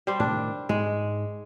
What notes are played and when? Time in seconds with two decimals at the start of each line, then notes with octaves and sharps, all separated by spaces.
0.07 G3 C5
0.20 A2 C3 D#3 D4
0.69 G#2 G#3